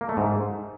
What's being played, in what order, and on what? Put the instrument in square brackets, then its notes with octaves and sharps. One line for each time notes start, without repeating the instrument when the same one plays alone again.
[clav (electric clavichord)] A#3
A3
G#2